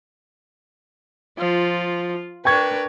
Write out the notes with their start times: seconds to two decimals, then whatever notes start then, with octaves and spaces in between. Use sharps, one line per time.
1.38 F3 F4
2.45 D4 A#4 B4 G5 C#6 G#6